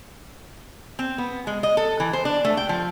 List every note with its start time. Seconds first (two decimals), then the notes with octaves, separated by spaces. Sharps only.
0.99 C4
1.18 B3
1.47 G#3
1.63 D#5
1.77 A4
2.00 E3
2.13 C5
2.25 D4
2.45 A3
2.57 G5
2.69 F3